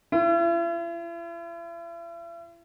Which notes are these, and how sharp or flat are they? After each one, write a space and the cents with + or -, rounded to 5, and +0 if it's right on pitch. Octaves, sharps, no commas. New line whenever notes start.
E4 +45